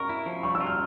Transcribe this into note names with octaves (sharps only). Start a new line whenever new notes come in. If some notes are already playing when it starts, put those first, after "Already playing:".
Already playing: A#4 C#6
E4
F3
G3 C#6
E6
F4
F6